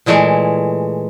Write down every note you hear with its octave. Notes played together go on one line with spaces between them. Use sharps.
A#2 E3 G#3 A3